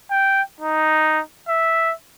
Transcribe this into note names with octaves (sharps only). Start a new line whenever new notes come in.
G5
D#4
E5